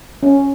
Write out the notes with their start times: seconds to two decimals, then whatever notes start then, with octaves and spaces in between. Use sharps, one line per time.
0.23 C#4